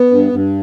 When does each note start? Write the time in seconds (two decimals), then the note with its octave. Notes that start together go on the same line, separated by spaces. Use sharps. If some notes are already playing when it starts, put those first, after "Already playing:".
Already playing: B3
0.11 G2
0.32 G2